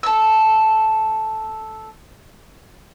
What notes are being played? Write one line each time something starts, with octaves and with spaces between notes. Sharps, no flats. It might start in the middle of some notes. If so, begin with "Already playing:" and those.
A4 E6